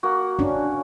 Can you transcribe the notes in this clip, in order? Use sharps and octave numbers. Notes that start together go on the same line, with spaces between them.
A#3 F#4
C#4 D4